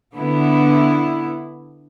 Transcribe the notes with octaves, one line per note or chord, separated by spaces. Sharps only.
D3 B3 E4